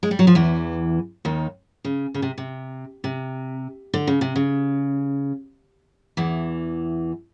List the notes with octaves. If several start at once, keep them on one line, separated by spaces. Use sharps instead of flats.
G#3
G3
F#3
F3
E2 E3
D#2 D#3
C#3
C#3
C3
C3
C3
D3
C#3
C3
C#3
E2 E3